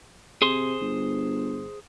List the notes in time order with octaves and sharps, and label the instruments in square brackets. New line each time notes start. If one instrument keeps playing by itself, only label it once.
[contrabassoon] C3 [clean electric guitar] G#4 C5 C6
[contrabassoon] G1